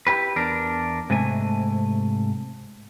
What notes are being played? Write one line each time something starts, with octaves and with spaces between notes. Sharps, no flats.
E4 G4 B4
E2 D4 A#4
G#2 C3 A3 G#5